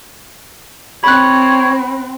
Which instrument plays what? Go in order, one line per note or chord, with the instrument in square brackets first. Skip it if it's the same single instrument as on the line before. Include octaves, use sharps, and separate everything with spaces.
[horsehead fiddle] C4 [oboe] C#5 [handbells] B5 F#6